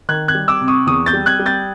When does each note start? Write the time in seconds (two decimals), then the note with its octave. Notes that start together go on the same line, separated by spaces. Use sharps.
0.09 D#3 F#6 G#6
0.28 F#6 G#6
0.35 G3
0.48 D6 E6
0.61 C3
0.68 C#6 D#6
0.87 E2 C#6 D#6
1.06 G6 A6
1.13 G3
1.26 F#6 G#6
1.40 G3
1.46 G6 A6